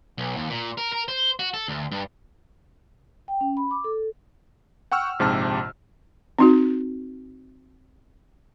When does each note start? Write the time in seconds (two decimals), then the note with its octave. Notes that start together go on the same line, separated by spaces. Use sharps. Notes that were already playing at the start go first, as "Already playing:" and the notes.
0.18 B1
0.36 D#2
0.50 A#2
0.78 A#4
0.92 A#4
1.08 C5
1.39 F#4
1.54 A4
1.68 D2
1.92 G2
3.28 G5
3.41 C#4
3.57 B5
3.71 D6
3.84 A4
4.92 F#5 G5 C#6 E6 F6
5.19 A#1 G#2 C3 G4 A5 F6
6.39 C4 D#4 F#4